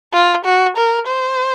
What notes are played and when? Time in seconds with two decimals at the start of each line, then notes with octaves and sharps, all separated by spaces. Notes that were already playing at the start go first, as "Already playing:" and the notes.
0.13 F4
0.45 F#4
0.77 A#4
1.07 C5